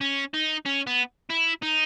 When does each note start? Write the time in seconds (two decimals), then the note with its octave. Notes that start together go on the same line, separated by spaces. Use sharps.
0.01 C#4
0.34 D#4
0.66 C#4
0.87 B3
1.30 E4
1.62 D#4